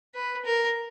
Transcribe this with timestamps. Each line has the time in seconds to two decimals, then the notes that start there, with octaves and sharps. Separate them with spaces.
0.14 B4
0.45 A#4